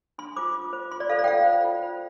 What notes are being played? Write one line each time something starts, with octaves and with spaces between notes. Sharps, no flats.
D4 C6
F4 C5 D6
F4
C5
F4 C6
D5
A4 C5 F5
D5
G5
F4 F5
C5
F4
C5